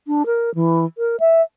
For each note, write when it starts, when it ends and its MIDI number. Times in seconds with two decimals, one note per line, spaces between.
0.07 0.23 62
0.26 0.53 70
0.55 0.85 52
0.98 1.16 70
1.20 1.42 76